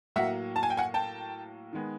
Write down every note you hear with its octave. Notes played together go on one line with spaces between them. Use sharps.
A2 F#3 A#3 E5 F#5
A5
G#5
G5
F#5 G#5
G5 A5
D#3 G#3 B3